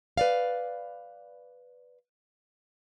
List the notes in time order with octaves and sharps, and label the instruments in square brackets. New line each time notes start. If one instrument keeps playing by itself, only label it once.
[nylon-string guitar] B4 D5 F5